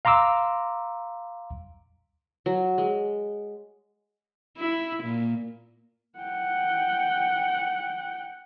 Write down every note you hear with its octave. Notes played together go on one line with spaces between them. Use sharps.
F5 A#5 C6 D6 E6
F#3
G#3
E4
A#2
F#5 G5